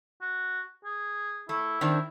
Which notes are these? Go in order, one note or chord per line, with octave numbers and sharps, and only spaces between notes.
F#4
G#4
A3 E4
D#3 C4 D4